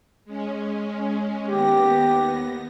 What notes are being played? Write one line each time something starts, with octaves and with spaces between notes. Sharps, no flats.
G#3 C#4
D#2 B3 G4 A#6